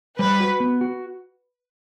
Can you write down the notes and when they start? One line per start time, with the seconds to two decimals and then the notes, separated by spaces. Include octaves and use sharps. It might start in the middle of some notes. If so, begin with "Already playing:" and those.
0.19 G3 B4
0.40 F#4
0.60 B3
0.81 F#4